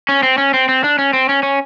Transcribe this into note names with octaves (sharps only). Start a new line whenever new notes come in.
C#4
C4
C#4
C4
C4
D4
C#4
C4
C#4
C#4